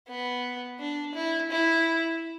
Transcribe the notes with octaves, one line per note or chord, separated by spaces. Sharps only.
B3
D4
E4
E4